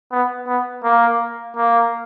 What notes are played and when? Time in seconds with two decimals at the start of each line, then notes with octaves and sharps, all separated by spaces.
0.12 B3
0.47 B3
0.84 A#3
1.56 A#3